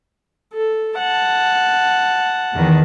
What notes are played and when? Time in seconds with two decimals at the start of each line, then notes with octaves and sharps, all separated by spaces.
0.53 A4
0.98 F#5 A5
2.53 E2 D#3